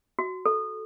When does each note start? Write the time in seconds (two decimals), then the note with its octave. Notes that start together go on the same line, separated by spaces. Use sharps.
0.19 F#4
0.45 A4